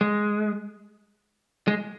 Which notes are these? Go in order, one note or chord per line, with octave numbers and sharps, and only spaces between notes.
G#3
G#3